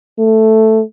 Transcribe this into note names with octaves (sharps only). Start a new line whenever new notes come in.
A3